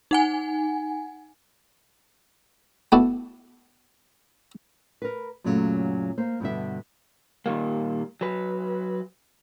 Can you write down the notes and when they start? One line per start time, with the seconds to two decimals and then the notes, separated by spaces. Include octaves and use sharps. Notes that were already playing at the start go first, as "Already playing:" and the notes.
0.11 D#4 F#5 G#5
2.92 A3 B3 E4 F#4 D5
5.02 A#4 B4
5.44 F#2 A#2 C#3 F#3 A3
6.18 A#3 C5
6.40 G2 B2 D3 E5
7.46 A#2 D#3 G3 A#3
8.21 F#3 B4